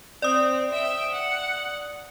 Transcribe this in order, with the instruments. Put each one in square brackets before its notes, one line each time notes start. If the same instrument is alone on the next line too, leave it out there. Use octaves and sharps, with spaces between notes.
[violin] C4 [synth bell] D5 D#6
[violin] E5 G5
F#5